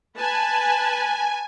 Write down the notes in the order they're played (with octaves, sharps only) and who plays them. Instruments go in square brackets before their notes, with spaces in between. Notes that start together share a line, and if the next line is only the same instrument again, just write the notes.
[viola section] B4 A5 [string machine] G#5